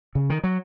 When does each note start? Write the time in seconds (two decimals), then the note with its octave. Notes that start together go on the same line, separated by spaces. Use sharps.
0.15 C#3
0.30 D#3
0.44 F#3